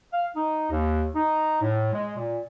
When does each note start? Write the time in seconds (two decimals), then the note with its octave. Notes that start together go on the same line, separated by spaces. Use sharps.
0.12 F5
0.36 D#4
0.70 D#2
1.14 D#4
1.61 A2
1.92 G#3
2.17 A#2